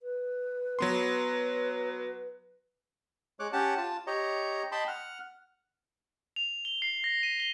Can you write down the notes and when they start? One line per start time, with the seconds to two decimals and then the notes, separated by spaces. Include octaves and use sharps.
0.01 B4
0.79 F#3 B3 C6
3.40 G#3 C#5 D6 F#6
3.53 C#4 G4 F#5 A5
3.77 F4 A5
4.07 G4 C#5 D#5 A#5
4.72 D#5 G5 A5 B5 C6
4.88 F#5 F6
6.36 F7
6.65 G7
6.82 C7
7.04 A#6
7.23 D#7
7.40 G7